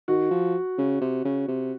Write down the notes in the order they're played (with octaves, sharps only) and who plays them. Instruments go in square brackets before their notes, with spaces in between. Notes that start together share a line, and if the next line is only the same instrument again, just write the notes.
[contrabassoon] D#3 [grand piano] F#4
[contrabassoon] F3
C#3
C3
C#3
C3